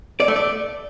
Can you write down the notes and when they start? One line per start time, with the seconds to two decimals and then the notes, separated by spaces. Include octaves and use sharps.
0.20 D5
0.28 A3
0.36 D5